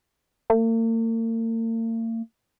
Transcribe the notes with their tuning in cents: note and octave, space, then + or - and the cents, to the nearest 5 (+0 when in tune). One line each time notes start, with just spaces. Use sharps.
A#3 -45